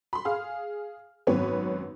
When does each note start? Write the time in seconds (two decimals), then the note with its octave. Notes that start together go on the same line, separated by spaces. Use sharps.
0.13 B5 C6
0.25 G#4 F5 F6
1.27 G#1 F#2 B3 C4 B4 C#5